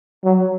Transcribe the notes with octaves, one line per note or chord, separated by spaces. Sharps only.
F#3